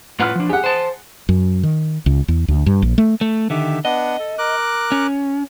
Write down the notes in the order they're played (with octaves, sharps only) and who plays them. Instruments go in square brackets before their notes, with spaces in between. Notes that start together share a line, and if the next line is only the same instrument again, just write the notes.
[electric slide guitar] A2 F4 B4 [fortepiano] F#5 F6
[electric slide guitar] F3 D4
[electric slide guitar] G4 [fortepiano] G#4 F#5
[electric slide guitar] C5 A5
[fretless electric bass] F#2
D#3
C#2
E2
D2
G2
A#1
A3
[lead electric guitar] A3
[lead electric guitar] D3 D#3 [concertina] G4 E5
[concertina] B3 D4 F#5 [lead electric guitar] D#5
[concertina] A4
A#4 D6 F#6
[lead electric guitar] C#4